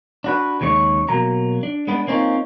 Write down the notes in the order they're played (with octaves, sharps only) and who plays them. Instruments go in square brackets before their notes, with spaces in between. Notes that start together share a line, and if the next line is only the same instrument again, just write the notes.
[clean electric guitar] D4 F#4 B4
D#2 C#3 G#3 C#5
B2 F#3 A#3 A#5
D4
G#3 B3 D4
A#3 C4 C#4 D#4 F4